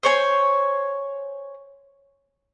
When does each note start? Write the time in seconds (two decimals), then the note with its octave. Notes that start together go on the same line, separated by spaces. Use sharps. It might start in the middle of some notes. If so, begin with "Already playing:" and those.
0.03 C5 C#5 G#5